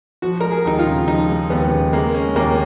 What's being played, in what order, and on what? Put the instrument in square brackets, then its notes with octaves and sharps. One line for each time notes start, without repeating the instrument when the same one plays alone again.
[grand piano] F3 [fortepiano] F#4
[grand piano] G#3 [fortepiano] A#4
[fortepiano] G#4
[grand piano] D#2 [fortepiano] D#4
[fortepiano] F4
[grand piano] C#3
[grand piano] F3 [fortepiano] D#4
[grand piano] G#3
[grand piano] D#2 [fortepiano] B3
[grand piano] C#3
[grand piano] G#3 [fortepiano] A#3
[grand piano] C#4
[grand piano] D#2 [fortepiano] A#3